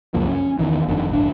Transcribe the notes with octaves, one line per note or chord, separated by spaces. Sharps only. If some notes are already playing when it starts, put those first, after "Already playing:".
C#2 F#2 F3 A#3
C#4
E2 D#3 E3
G1 F2 D3 D#3
D1 G1 D4